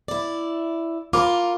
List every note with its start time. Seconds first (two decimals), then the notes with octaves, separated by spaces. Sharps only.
0.08 E4 D5
1.13 F4 A#4 B5 D6